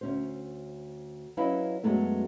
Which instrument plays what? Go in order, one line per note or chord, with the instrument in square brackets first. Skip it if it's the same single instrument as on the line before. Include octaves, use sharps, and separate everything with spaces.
[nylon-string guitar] D2 C#4 C5
F#3 C#4 E4 B4 D#5 F5
F#2 F#3 G#3 A3 B3 C#4